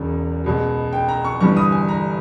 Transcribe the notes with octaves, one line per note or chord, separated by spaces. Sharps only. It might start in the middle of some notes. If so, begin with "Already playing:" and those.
Already playing: E1 E2 C#3
C#2 B2 G#3
G5
A#5
C#6
G1 G2 E3 G3 C#6
D#6
G#5
A#5